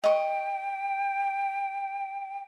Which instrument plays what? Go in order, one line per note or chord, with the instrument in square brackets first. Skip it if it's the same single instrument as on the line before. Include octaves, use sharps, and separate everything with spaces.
[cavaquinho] D#5 C#6 [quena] G5